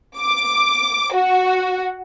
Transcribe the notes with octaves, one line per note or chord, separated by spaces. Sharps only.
D6
F#4